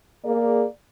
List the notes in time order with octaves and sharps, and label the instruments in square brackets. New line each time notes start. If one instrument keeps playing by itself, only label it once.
[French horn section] A#3 G#4 D5